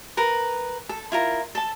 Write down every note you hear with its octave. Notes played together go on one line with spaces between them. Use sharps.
A#4 B4
A4
E4 F4 A#4
A4 A5